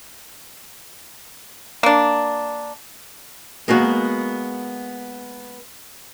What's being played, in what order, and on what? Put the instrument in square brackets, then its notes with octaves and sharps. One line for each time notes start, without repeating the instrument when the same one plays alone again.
[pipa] A#3 D4
[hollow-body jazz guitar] G#3 A#3 B3 F#4